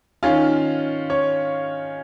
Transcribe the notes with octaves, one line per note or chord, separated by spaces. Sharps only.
D#3 C#4 F4 F5
C#5